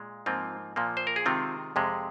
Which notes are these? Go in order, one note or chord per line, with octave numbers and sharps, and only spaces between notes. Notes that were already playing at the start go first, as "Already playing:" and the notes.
Already playing: A#2 G#3
G#2 F3 A#3 C4 F4
A#2 F3 A#3
C5
A#4
G#4
C3 D#3 G#3 C4 F4
F2 C3 G#3